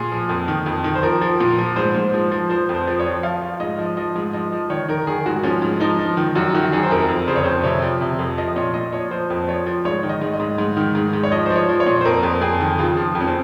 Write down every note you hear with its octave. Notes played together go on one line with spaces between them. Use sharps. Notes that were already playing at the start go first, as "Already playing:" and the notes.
Already playing: A#2 G#4
F3
F2
D#3
F2
D#3
C5
F3 A#4
F3
A#2
F3
G#2 C5
G#2
F3
F3
F3 C5
F2
C5
F3
C#5
F3
F3 F5
F3
G#2 D#5
F3
F3 D#5
G#2
F3 D#5
F3
D#3 C#5
D#3 A#4
D#3 G#4
G#2 F#4
F3 C#4
G#2
F3 D#4
F3
D#3
F#2 F#4
D#3 F#4
F#2 G#4
C5
F2 A#4
F2
C#3 C5
C#5
F2 C5
C3 C#5
F3
C3
F2
F3 D#5
A#2 C#5
A#2 D#5
F3 C#5
F3 C5
F2
F3 C#5
F3
G#2 C#5
D#3
D#5
G#2
D#5
G#2
G#2
D#3
G#2
G#2
C#5
F3 D#5
F3 C5
C#5
F3
C#5
A#2
C5
F2 A#4
F2
F2 G#4
D#3
C#3 F4
F3
F2
C#4
C4